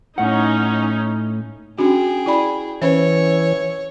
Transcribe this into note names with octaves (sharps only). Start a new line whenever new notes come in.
A2 C#4 D#4 F#5
C#4 D4 F#4 G#4 G5
E4 D5 B5
E3 C#4 C5 C#5